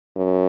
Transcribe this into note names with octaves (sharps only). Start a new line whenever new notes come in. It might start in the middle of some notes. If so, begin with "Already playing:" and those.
F#2